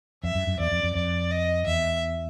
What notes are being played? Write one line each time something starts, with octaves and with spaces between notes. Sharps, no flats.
F2 E5
F#2
F#2
E2 D5
F2
F2
F2 D5
D#5
E2 E5